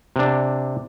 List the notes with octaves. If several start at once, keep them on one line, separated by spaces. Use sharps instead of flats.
C3 D4